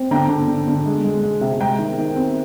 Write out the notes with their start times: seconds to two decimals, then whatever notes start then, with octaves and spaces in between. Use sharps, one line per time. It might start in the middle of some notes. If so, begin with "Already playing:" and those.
Already playing: C4
0.11 D3 G5 A#5
0.29 D3
0.48 D3
0.67 D3
0.86 G#3
1.04 G#3
1.23 G#3
1.41 C3
1.60 G#3 G5 A#5
1.79 D#3
1.98 D#3
2.16 C4